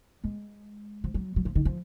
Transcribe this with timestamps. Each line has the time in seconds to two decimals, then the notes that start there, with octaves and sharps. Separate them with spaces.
0.24 G#3
1.04 F3
1.14 F#3
1.36 F#3
1.45 F3
1.55 D#3
1.65 F3